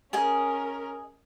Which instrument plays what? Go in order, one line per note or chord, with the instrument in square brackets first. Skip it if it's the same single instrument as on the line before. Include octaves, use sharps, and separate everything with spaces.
[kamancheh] C#4 A#4 [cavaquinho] G#4 D#5 G#5